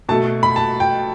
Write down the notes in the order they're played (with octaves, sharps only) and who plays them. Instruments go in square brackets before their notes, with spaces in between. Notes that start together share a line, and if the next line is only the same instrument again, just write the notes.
[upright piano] B2 A3 A5
B5
A5
G5